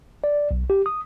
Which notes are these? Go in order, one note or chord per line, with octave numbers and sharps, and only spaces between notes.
D5
B1
G4
D#6